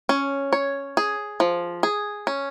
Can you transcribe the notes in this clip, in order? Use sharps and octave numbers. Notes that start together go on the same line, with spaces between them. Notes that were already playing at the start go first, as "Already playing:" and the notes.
C#4
C#5
G#4
F3
G#4
C#4